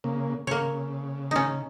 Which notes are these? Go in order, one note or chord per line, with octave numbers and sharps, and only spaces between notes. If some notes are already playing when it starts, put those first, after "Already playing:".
C#3 A#3
C#3 A#3 C#5
C#4 D#4